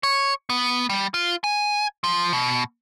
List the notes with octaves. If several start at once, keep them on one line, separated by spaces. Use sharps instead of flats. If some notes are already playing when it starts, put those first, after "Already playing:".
C#5
B3
G3
F4
G#5
F3
B2